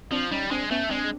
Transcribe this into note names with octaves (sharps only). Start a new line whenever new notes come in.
F3 C4 D4
G3 C#4 D#4
G#3 C4 D4
A3 B3 C#4
G#3 C4 D4